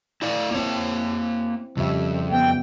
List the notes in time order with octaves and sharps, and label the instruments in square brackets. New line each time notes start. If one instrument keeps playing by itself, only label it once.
[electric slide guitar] E4 D5 F5
[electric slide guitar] A#3 C#5 [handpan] C4 E4
[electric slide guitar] F2 [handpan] C#3 G3 E5
[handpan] B3 [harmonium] G5